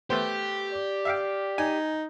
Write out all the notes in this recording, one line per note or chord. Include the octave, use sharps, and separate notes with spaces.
A3 B3 G4 C5
D5
E5 F5 G5
D#4 G#5